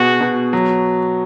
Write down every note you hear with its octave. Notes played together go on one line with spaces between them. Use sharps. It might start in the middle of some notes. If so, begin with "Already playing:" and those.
Already playing: B2 F#4 G#4
B2
F#3